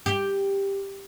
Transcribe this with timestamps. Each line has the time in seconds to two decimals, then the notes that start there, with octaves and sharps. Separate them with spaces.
0.06 G4